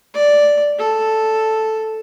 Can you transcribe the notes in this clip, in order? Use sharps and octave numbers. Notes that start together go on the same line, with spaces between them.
D5
A4